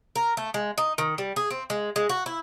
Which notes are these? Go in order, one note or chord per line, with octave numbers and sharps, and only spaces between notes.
A#4
A3
G#3
D#4
D#3
G3
G#4
C4
G#3
G#3
F#4
E4